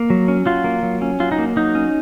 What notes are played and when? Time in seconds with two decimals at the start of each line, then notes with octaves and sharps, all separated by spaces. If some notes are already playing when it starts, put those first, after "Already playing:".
Already playing: A#3
0.10 F#3
0.28 C#4
0.46 F#3 F4
0.64 A#3
0.83 F#3
1.02 C#4
1.20 F#3 F4
1.32 D#4
1.38 A#3
1.56 F#3 D#4
1.75 C#4